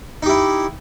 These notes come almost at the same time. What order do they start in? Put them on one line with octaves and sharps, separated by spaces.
D#4 G4 E4